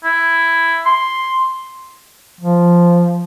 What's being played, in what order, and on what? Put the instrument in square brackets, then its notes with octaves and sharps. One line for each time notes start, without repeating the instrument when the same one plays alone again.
[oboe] E4
C6
[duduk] F3